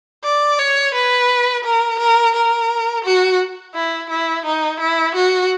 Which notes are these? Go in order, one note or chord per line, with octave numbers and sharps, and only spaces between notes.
D5
C#5
B4
A#4
A#4
A#4
F#4
E4
E4
D#4
E4
F#4